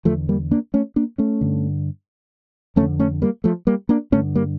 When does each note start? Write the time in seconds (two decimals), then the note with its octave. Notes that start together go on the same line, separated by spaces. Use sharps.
0.05 E2 D3 F3 A3
0.29 G3 A#3
0.51 A#3 D4
0.74 A3 C#4
0.96 A#3 D4
1.18 A3 C#4
1.41 G2 D3
2.76 F2 A3 C#4
2.80 D3
2.99 A3 C#4
3.22 G3 A#3
3.44 F3 A3
3.67 G3 A#3
3.89 A#3 D4
4.12 G2 D3 A3 C#4
4.35 G3 A#3